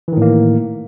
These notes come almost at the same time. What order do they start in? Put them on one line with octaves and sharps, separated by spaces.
E3 D#3 A2 A#3